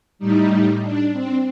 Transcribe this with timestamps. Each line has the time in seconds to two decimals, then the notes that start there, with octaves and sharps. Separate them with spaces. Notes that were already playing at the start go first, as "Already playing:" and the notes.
0.19 A2 G3 D#4
0.81 D4
1.12 C4